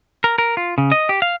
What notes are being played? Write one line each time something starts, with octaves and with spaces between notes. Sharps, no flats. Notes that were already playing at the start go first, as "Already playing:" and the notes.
A#4
A#4
F4
C#3
D#5
G4
F5